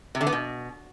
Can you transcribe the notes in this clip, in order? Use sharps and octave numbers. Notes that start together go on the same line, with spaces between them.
C3
D3
B3
B2